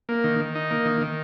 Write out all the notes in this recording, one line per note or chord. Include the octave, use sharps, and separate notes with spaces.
A#3
D#3
D#3
D#4
A#3
D#3
D#3